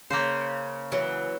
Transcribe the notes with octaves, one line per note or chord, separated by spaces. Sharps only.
C#3 A#3 C5
E3 F#3